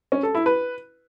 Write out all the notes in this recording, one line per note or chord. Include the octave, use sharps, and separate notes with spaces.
C#4
A4
E4
B4